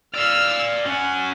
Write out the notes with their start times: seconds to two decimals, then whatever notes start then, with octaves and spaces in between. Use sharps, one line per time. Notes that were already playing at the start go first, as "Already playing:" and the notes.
0.14 D5 F5 E6 F6
0.85 C#4 F#5 G#5